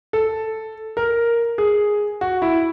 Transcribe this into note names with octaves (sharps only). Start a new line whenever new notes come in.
A4
A#4
G#4
F#4
E4